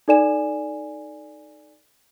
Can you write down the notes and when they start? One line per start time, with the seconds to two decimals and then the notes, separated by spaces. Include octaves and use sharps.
0.08 D#4 A4 D5 G#5 E7